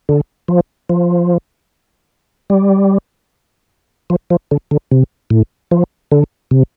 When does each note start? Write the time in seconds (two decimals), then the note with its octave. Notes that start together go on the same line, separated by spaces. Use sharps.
0.09 D3
0.48 F3
0.89 F3
2.50 G3
4.10 F3
4.30 F3
4.51 D3
4.71 D3
4.91 C3
5.30 A2
5.71 F3
6.12 D3
6.51 C3